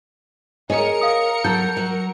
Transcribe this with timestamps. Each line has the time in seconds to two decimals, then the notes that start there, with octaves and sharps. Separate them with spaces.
0.70 G#4 A#4 C#5 D#5 C#7
1.01 F5 D#6
1.44 F#3 A4 G6
1.77 F#3